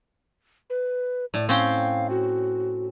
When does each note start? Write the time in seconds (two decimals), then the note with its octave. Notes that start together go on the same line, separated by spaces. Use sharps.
0.70 B4
1.34 A2 D5
1.49 C4 C#4 F5 G5
2.10 F#4